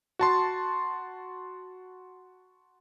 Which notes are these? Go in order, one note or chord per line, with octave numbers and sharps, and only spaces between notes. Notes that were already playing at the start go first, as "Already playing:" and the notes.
F#4 A5 C6